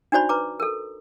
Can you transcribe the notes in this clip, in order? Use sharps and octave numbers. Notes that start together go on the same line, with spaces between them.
D4 D#4 F#4 C5 D5 B5
B4 A#5 D6
A4 A#4